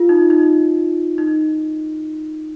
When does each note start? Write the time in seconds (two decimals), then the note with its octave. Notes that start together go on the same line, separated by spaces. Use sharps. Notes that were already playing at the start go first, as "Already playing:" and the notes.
Already playing: F4
0.09 D#4
0.30 D#4
1.18 D#4